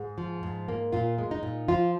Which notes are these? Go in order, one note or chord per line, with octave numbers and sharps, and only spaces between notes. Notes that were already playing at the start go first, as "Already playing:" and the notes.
Already playing: G#2 G#4
F3
G#2
A#3
A#2 F4
G#3
D#4
A#2
F3 F4